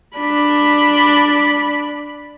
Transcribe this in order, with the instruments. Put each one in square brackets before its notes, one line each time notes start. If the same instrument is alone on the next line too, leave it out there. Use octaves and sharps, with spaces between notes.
[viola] D4 B5